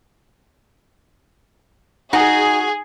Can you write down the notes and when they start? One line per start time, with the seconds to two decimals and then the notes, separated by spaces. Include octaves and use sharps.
2.13 D#4 F#4 G#4